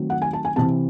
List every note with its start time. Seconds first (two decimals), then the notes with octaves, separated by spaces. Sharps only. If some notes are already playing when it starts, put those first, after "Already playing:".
Already playing: D#3 F#3 A3 C4
0.10 F#5
0.22 G#5
0.33 A5
0.45 G#5
0.56 C3 E3 C4 A5